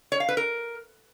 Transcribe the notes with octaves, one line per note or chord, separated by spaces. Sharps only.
C#5
F5
B4
A#4